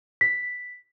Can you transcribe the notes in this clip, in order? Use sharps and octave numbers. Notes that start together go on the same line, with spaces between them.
B6